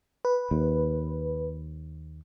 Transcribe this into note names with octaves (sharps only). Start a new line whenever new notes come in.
B4
D#2